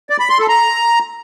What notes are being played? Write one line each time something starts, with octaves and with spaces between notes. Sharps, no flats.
D5
B5
C6
A4
A#5